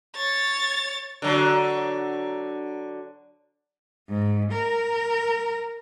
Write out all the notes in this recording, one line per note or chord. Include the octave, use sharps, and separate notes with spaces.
C#5 A6
D3 F#3
G#2
A#4